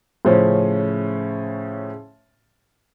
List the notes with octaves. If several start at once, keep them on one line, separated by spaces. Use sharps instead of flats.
A2 C#3 F3 C#4